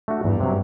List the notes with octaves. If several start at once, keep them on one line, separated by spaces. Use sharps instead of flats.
A3 D4 F#4
E2 G2
C3 F#3